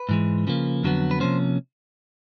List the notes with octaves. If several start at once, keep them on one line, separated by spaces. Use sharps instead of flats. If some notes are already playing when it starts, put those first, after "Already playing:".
Already playing: B4
G#2 E3 G#3
C#3 F3 A#3
F2 D3 F#3 B3
B4
C3 F3 A#3 C#4 C5